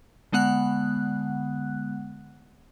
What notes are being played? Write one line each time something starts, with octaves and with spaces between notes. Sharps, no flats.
D3 G#3 B3 F#5 F#6